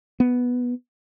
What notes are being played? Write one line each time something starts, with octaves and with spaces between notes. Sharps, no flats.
B3